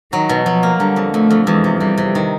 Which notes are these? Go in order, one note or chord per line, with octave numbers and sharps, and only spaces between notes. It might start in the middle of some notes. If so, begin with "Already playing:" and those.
D#3 F#3
B2
F3 F#3
A#3
D3 G3
F2
F2 A3
F2
E2 G#3
C3
C3 G3
C3
D#3